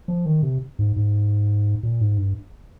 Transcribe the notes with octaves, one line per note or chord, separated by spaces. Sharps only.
F3
D#3
C3
G#2
G#2
A#2
G#2
G2